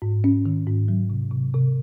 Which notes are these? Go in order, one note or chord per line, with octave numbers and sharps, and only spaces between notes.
G#2
C#4
D#3
G#2
F#3
C3
C3
C3